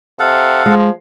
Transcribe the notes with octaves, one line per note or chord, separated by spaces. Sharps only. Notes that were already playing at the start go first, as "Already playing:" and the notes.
C3 A4 F5 F#5
F3 G#3